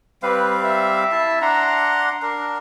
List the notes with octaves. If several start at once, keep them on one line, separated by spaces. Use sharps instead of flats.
G3 C4 B4 F5
E5
E4 A5
D4 F#5 A#5 C6
D4 A#4